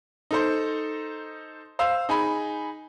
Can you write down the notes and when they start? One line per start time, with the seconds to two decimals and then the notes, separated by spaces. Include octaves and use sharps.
0.31 D#4 A4 C5
1.79 C5 F5 E6
2.09 D#4 G#4 G#5 B5